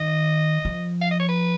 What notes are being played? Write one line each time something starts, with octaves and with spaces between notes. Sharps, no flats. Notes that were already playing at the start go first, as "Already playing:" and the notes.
Already playing: D#3 D#5
F3
F5
D#5
C#5
B4